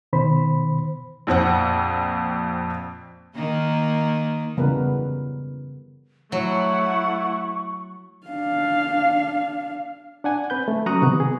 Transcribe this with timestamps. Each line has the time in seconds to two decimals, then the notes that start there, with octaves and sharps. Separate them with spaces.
0.13 B2 D#3 C5 B5
1.27 A#1 F2 C4 F#5
3.35 D#3 A#3
4.57 C#3 E3 G3 B3 A#4 B4
6.32 F#3 A3 E4 F#5 C#6
8.27 D4 F5
10.24 D4 F#5 G#5
10.50 C4 B4 G6
10.68 A3
10.86 F#3 C#4 A#5 C#6 D#6 F#6
11.02 C3 D#3 B3
11.20 G#4